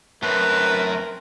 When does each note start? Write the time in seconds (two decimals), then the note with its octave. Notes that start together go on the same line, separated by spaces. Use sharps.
0.23 F#2 A3 C4 A#4 B4